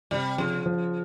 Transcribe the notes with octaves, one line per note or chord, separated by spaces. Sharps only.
C3 G3
C#3 F3
F3